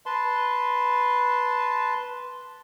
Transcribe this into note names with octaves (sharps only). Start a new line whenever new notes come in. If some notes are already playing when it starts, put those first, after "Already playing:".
B4 A5 C6